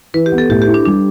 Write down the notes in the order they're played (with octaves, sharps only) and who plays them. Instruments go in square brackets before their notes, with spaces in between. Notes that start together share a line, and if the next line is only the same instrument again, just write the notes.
[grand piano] E3 [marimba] B4
[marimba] G4
[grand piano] B3
[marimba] A4
[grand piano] A2 [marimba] G4
[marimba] G4
[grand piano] E4
[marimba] D4
[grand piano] G3 [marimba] D4